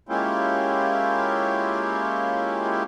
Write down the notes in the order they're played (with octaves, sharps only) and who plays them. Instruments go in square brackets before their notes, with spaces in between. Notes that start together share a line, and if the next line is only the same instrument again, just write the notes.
[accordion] G#3 A#3 C#4 E4 F4 G4